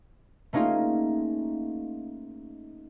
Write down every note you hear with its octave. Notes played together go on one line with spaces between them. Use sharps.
A3 A#3 C#4 D#4 F4 G#4